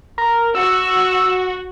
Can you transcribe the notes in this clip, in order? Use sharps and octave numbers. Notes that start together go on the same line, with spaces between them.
A#4
F#4 E6